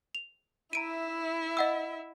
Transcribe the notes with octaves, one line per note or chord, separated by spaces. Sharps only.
F7
E4 E5 A#5 D7 D#7
D#5 F#5 E6